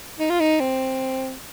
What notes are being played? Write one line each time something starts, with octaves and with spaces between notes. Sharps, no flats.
D#4
F4
D#4
C4